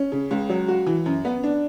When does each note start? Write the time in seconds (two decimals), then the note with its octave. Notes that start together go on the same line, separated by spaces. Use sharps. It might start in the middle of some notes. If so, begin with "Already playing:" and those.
Already playing: C#4
0.12 C#3
0.31 C#2
0.50 F#3
0.68 F#4
0.86 E3
1.06 F#2
1.25 B3
1.43 D4